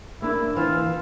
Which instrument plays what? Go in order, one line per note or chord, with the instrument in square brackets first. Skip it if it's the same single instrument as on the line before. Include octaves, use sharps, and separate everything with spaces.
[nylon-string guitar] A#3 D4 [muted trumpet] E4
[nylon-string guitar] E3 [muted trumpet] F4